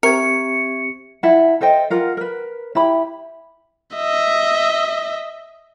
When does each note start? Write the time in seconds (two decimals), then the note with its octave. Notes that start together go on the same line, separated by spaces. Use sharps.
0.03 C4 G4 A#4 E5 C#6 G#6 C#7
1.23 E4 F#5 A5
1.61 A4 C5 D#5 G5
1.90 F4 A#4 F#5
2.17 A#4 B4
2.75 E4 G4 B5
3.96 D#5 E5